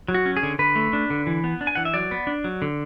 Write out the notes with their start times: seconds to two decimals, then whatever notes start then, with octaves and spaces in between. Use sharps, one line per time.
0.08 F#3
0.14 F#4
0.26 C#4
0.37 G#4
0.43 D3
0.59 D3 B4
0.76 A3
0.93 D4
1.10 D3
1.27 E3
1.44 B3
1.61 D4
1.67 G#5
1.75 E3 F#5
1.85 E5
1.94 F#3 D5
2.11 B3
2.27 D4
2.44 F#3
2.62 D3